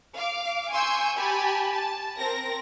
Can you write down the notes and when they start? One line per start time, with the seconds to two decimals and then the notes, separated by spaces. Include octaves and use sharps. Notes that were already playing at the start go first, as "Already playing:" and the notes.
0.17 F5 D6
0.72 G#5 C6 C#6 E6 G6
1.16 G4 G#5 A5 B5
1.73 A5
2.18 C4 A#4 A#6